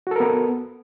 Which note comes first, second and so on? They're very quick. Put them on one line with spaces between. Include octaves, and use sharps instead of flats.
F#4 A4 A#4 B3